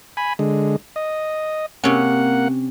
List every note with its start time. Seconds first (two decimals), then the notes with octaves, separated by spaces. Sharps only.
0.17 G#5 B5
0.39 D3 G#3
0.96 D#5
1.84 C3 A#3 C#4 F#5